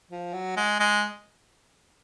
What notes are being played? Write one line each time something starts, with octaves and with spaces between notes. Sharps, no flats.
F3
F#3
G#3
G#3